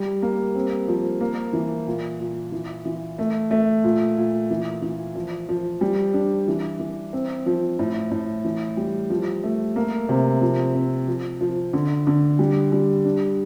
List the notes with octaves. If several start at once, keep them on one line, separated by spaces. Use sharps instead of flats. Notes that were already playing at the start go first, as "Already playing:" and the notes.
Already playing: G3
A#3
C4
F3
A#3
E3
A#2
A#2
E3
E3
A3
A3
A#2
A#2
E3
E3
F3
F3
G3
D4
E3
E3
C4
F3
A2
A2
E3
G3
F3
A3
A#3
C3
F3
C4
F3
F3
D3
D3
G3
G3
D4